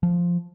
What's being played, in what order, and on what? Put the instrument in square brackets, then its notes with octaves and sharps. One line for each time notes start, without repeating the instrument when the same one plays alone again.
[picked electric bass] F3